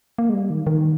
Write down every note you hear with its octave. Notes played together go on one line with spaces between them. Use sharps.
A#3
G#3
G3
D#3
D#3